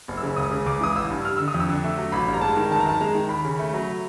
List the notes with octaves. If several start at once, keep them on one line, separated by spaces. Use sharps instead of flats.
F#1
E6
C#3
C#2 D#6
C#3
C#2 D6
E3 D#6
A1 E6
G2
G3 F6
D3 E6
D#6
F2
E6
D3
A3
F#3
A1 B5
G2
A#5
G#3 A5
D#3
G1 A5
A#5
F#2 A5
G#3 A#5
D#3
D#2 B5
C#3
A3
F#3